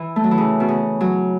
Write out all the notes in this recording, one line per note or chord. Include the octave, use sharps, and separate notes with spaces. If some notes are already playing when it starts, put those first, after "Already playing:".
Already playing: E3
A3
F#3
E3
C#3
B2
C#3
F#3